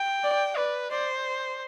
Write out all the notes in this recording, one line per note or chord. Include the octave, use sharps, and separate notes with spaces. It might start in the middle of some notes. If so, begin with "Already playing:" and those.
Already playing: G5
D5
B4 D5
C5 D5